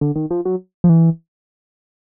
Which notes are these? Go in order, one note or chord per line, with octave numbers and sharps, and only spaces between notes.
D3
D#3
F3
F#3
F3
E3